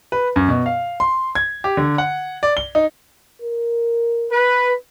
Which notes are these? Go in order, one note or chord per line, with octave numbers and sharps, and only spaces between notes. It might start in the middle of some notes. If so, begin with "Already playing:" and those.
B4
F#2
B2
F5
C6
G#6
G4
D3
F#5
D5
G7
D#4
A#4
B4